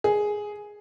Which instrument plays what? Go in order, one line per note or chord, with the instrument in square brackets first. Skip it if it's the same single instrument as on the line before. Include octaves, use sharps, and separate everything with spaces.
[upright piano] G#4